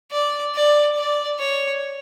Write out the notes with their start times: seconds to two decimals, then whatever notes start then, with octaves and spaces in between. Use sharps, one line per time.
0.11 D5
0.55 D5
0.97 D5
1.39 C#5